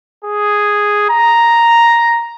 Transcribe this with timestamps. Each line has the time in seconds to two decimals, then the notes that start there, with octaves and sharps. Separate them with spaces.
0.25 G#4
1.10 A#5